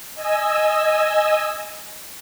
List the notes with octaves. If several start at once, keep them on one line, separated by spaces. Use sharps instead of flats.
D#5 G#5 E6